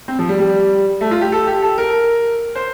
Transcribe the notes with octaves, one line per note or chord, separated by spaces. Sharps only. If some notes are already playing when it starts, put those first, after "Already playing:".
C4
F3
G3
G3
A3
F4
G4
A4
G4
A4
A#4
C5